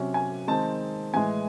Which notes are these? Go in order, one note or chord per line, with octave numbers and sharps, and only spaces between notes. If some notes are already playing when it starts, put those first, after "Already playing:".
Already playing: C3 F#3 C#4
G#5
D#3 G#3 C4 D#4 A5
A2 E3 G#3 G#5